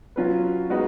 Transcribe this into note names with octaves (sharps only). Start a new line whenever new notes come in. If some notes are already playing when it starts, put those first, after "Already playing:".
F#3 C#4 F4 B4
G#3 B3 D#4 F#4 B4